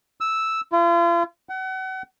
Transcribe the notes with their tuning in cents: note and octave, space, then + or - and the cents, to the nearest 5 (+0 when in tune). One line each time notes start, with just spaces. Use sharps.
E6 -5
F4 -40
F#5 +35